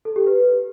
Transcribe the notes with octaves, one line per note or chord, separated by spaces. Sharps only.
A4
G4
B4